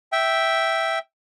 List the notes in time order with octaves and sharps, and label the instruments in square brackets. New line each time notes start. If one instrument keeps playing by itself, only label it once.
[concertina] E5 G5